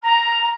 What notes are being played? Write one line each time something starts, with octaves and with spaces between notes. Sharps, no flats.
A#5